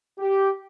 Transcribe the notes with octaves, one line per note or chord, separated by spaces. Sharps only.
G4